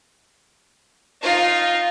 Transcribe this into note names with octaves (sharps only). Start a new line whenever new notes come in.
D#4 F4